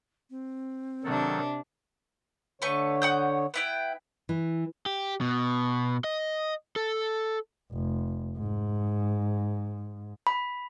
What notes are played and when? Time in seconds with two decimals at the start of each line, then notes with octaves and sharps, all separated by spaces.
0.30 C4
1.04 C3 D#3 F#3 D4 A4
2.62 D3 A3 B4 C#5 C#6
3.02 F#5 D#6 G6
3.54 B3 E4 G5
4.29 E3
4.86 G4
5.21 B2
6.04 D#5
6.76 A4
7.73 F1
8.38 G#2
10.27 B5